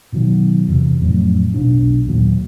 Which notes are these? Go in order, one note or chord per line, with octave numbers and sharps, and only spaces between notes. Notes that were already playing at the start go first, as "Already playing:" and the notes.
B2 D#3 F#3
E2 C3 E3
F2 A2 F#3 C#4
B1 B2 D4
D#2 A#2 F#3